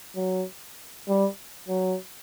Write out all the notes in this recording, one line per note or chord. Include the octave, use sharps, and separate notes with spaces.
F#3
G3
F#3